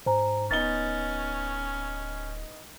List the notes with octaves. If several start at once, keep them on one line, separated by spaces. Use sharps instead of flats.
G#2 C5 G#5 A#5
D1 B3 C#4 D#4 A6 G7